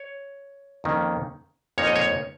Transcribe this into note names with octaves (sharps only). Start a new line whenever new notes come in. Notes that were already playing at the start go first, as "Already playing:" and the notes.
Already playing: C#5
F2 D#3 A#3 C#4
F2 F3 A#3 D#4 C#5
D#5
C#5